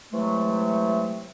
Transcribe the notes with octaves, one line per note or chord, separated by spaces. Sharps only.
C3 E3 F#3 G#3 A3